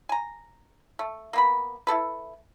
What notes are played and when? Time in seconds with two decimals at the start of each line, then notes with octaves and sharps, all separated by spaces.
0.09 G#5 A#5
0.99 A3
1.33 A#3 B3 B5
1.87 E4 G#4 A4 B4